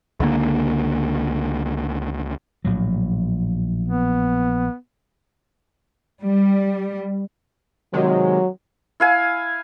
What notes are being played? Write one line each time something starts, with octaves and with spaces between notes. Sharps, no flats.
C#2 D3 A#3
A#1 A2 F#3
B3
G3
C3 D#3 F#3 G#3
E4 F5 G#5